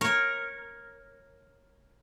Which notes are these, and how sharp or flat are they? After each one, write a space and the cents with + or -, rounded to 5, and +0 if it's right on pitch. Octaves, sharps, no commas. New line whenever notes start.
A#4 +0 C#5 -15